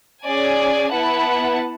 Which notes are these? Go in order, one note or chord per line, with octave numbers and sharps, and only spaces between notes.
C#4 G#4 D5 G#5
B3 E4 B4 F#5 A5